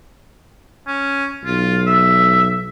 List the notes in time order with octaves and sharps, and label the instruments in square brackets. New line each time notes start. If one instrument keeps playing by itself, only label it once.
[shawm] C#4
[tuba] B1 [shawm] F4
[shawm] E5